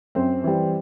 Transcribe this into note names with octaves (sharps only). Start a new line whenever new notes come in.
F#2 C4 C5
E3 G3